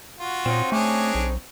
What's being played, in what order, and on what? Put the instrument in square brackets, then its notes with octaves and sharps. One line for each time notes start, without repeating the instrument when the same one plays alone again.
[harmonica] F4 F#4
[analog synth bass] A#2 [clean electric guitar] C4 C#4 D#4
[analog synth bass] A3 [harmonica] D4 G#4 C#5
[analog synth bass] B1